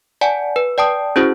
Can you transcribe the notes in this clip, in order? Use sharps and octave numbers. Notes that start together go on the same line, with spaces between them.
D5 F#5 G#5 A5
B4
D5 G5 A5 D#6
C#4 E4 F#4 G#4 C5